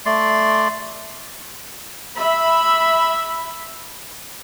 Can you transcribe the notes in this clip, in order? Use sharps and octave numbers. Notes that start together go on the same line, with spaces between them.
A3 D5 C6
E5 B5